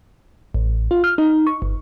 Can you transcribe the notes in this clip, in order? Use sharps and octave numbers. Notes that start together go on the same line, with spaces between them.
A1
F4
F6
D#4
C#6
G1